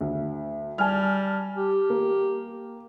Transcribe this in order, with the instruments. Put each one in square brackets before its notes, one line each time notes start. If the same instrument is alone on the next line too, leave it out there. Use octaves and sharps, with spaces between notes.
[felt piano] D2
[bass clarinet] G3 [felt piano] G#5 A5 F6
[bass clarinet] G4
[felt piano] A#3